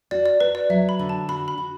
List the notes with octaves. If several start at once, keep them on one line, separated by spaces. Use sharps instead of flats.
F#4 D5
D5
F#4 B4
D5
F#3 E5
B5
D3
A5
F#4 B5
B5
F#4